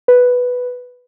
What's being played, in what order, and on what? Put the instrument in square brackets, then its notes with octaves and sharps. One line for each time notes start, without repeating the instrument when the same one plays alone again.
[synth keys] B4